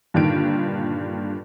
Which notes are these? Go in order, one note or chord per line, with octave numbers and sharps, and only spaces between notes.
G2 A#2 D3 D#3 D7